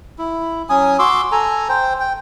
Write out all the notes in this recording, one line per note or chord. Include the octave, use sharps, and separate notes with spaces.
E4
F#3 C#4 G#5 D#6
F#4 C6 D6 E6
A4 G#5 A#5
C5 G5
G5